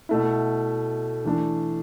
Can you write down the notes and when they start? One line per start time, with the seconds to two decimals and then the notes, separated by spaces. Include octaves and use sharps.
0.09 B2 A3 E4
1.25 E3 A3 D4